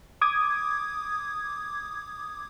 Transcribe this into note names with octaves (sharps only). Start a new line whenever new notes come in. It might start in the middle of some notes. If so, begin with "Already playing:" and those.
D6 D#6 G#6